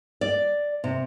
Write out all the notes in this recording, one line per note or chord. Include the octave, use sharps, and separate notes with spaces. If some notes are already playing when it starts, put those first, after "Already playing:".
D5
C3